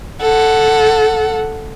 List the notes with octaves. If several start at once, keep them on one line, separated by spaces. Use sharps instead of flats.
A4 F#5